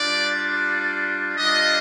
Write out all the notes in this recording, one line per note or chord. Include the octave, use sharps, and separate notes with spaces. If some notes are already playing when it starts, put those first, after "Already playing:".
Already playing: G3 D4 F4 D5
G3 D4 F4 D#5